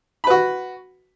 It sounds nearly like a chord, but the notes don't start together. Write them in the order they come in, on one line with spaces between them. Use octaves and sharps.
B5 B4 F#4